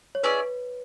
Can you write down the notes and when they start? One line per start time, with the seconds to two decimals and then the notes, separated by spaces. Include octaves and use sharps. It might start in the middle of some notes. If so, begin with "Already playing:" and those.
0.15 C#5
0.23 C#4 E4 G#4 B4 D5